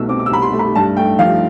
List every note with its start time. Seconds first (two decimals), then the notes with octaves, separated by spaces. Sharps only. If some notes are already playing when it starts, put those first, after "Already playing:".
Already playing: C2 B2 A3 E6
0.09 C4 D6
0.19 D6
0.26 E6
0.31 C2 B5
0.42 C6
0.53 A3
0.59 B5
0.75 G2 A5
0.97 A3 G5
1.19 F3 F5